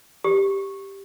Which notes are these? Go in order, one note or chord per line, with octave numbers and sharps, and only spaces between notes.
G4